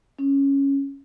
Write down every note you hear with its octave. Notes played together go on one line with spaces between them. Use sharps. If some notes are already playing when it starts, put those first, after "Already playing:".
C#4